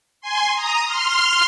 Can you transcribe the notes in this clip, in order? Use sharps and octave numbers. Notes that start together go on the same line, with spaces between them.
G#5 C6
A#5 D#6
C6 F6